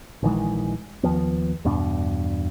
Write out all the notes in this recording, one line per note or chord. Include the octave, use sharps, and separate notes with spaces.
A#1 D#3 E3 G#3
D#2 F3 B3
E2 G2 B2 D4